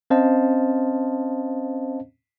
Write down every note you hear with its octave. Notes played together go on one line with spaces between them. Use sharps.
C4 C#4 C5 D#5 F5 A5